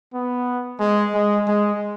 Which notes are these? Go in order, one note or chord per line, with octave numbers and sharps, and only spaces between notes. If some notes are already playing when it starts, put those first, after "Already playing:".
B3
G#3
G#3
G#3